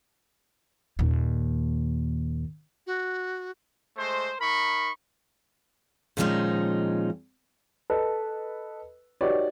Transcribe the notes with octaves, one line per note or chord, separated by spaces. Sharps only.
D#2 A#2
F#4
G#3 A3 C5
D#4 A#4 B5 C#6
A#2 D#3 F3 G#3 C#4 D#4
A4 B4 D#5
D#4 F#4 G4 B4 C#5 D5